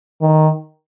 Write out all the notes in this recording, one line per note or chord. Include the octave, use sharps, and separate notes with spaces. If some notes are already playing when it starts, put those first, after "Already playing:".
D#3